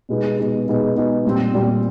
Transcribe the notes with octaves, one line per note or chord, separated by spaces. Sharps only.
B2 G#3 B3 D#4 G#4
B2 G#3 B3 D#4 G#4
B2 G#3 B3 D#4 G#4
B2 G#3 B3 D#4 G#4
A#2 G3 C4
A#2 G3 C4